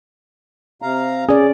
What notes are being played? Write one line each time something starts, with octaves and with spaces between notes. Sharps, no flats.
C3 F5 A#5
C#4 G#4 D5